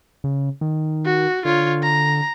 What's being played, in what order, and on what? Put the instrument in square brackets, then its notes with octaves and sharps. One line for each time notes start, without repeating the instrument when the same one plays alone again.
[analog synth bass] C#3
D#3
[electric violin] F#4
[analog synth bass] D3 [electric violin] F4 C#5
[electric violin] A#5